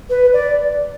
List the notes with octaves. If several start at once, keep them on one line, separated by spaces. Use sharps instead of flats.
B4
D5